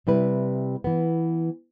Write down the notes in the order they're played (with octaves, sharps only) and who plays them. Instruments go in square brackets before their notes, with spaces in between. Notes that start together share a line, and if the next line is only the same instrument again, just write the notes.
[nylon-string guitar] C3 G3 E4 B4
E3 B3